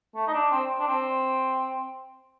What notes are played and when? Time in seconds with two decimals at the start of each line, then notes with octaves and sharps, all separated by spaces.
0.15 A3
0.27 D#4
0.33 D4
0.51 C4
0.79 D4
0.87 C4